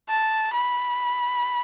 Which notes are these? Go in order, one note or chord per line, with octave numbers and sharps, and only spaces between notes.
A5
B5